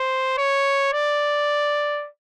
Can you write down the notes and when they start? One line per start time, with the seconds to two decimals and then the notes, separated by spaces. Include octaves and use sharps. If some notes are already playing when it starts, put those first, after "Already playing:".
Already playing: C5
0.38 C#5
0.93 D5